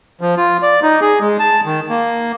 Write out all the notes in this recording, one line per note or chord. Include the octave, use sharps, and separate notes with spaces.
F3
F4
D5
D#4
G#4
G#3
A5
D#3
A#3